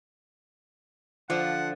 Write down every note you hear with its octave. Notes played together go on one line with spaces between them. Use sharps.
D3 F3 D4 F4 F#5